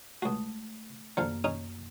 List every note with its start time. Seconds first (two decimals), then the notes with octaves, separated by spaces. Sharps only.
0.22 C#2 A3 F#4 D#6
1.17 F#2 D3 F3 A#3 F5
1.44 C#4 D#4 G#4